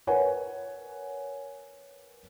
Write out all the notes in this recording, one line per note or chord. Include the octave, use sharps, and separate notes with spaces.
A#4 B4 C#5 F#5 G#5